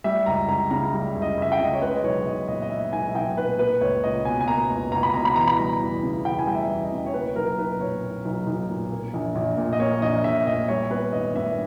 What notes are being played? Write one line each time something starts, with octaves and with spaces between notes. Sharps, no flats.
G3 E5
C#2 A#5
C#2 A#5
C#3 A#5
G3
C#2
D#5
C#2 E5
G5
C#3 D#5
C#5
G#3 B4
D#5
B1 C#5
B1 D#5
A#2 D#5
D#5
G#3 E5
B1 G#5
E5
B1 G5
A#2 B4
A#3 B4
C#2 C#5
C#2 D#5
B2 G#5
G#5
A#3 A#5
C#2
C#2 A#5
B5
B2 A#5
B5
E3 A#5
B5
G3 A#5
E2
C#3
E3 G5
G#5
G3 G5
E5
E2
D#5
C#3
C#5
A#3 B4
B1 A#4
B1 B4
A#2 C#5
A#3
B1
B1
A#2
A#3
A#1
A#1
A#2
D#5
A#3 C#5
A#1 D#5
A#1 E5
A#2 D#5
G3 C#5
B3 B4
G#1 D#5
G2 E5